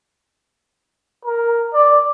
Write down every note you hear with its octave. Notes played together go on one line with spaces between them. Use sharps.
A#4
D5